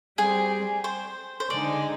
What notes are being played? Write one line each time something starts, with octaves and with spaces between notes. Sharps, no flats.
G3 C4 G4 G#4
C5
C5
D3 G#3 D#4 D5